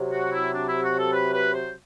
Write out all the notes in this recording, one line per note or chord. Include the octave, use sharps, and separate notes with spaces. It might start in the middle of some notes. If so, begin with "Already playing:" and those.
Already playing: C3 F#3
F#4
E4
D4
E4
F#4
A4
B4
B4
C5